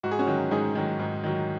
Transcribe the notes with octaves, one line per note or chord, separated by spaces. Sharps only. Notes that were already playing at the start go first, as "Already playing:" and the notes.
G#2 F#4
G#4
C#4 F#4
D#3 F#3
G#2 D#4 G#4
D#3 F#3
G#2
D#3 F#3